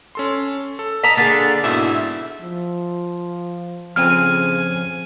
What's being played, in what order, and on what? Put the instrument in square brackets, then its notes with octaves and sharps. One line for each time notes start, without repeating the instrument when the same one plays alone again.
[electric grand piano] C#4 A4 C6
A4
[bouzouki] D#5 A5 A#5 [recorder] B6
[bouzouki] D3 [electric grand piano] A#3 G#4 [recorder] A6
[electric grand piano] G#2 B2 [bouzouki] E4 [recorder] E5
[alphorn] F3
[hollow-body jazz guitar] F2 C4 [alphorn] C#3 [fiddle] G#5 [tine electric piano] F6